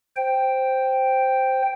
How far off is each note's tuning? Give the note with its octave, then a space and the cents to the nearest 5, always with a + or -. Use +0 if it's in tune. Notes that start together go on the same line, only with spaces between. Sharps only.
C5 +0 G5 +0